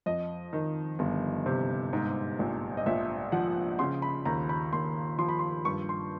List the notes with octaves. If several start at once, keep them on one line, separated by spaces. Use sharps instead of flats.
F2 D#5
D#3
G1
C3
G#2
A#1
D#5
A#1 E5
F3 F#5
C#3 C6
B5
D#2 A#5
B5
D#2 C6
F3 C6
B5
C6
G2 C#6
C6